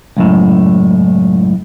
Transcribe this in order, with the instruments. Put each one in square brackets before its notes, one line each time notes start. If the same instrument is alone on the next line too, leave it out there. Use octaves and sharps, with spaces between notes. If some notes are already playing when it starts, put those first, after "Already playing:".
[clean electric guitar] C#2 F#2 A2